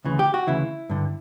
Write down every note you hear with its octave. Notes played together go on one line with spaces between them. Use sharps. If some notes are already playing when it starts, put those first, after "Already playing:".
D2 C#3 E3
G4
F#4
D2 C#3 E3 E4
G2 D3